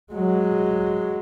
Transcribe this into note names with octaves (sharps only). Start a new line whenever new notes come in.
F#3 G#3